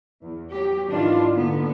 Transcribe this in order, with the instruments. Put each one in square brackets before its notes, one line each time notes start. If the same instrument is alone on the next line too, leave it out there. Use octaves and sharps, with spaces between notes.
[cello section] E2
F#3 G4
G#2 D#3 E3 D4 F4
A#2 D3 B3